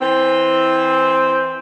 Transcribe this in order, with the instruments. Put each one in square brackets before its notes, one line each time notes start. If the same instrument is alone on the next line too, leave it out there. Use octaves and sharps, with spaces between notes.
[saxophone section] E3 C4